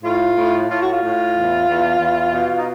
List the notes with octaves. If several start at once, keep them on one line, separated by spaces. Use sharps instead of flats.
A2 F4
A2
A2 F4
F#4
F4
A2
E2
E2
E2
B2
D#4